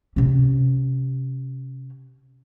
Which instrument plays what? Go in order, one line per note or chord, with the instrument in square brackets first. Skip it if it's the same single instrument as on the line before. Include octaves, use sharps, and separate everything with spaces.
[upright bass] C3 C#4